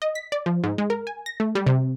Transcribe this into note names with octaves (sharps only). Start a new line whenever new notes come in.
D#5
B6
D5
F3
G#2
G#3
A#4
G#5
A#6
A3
G3
C3